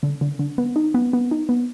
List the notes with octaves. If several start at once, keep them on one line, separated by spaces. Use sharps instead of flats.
D3
D3
D3
B3
D#4
B3
B3
D#4
B3